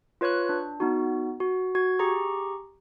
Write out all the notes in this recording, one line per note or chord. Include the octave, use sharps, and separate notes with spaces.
F4 B4 C#5 C#6 F#6
D4
B3 D#4 F#4
F#4
F#4 G#6
G4 G#4 A#5 C#6